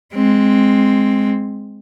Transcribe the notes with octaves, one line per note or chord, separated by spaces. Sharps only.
G#3 C4